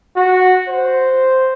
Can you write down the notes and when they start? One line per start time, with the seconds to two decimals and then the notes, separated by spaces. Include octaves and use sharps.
0.16 F#4
0.68 C5